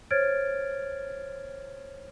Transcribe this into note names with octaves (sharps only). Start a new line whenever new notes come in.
C5 C#5 F6 G#6 A6 D7